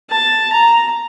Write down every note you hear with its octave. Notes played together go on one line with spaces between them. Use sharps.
A5
A#5